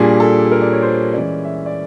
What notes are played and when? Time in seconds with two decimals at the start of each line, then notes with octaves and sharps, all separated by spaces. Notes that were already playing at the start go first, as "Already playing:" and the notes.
Already playing: A#2 G3 A#3 D4 G#4
0.20 A4
0.51 A#4
0.62 D5
0.72 C#5
0.83 C5
1.14 E3 G#3 C#4 D5
1.44 E5
1.66 D5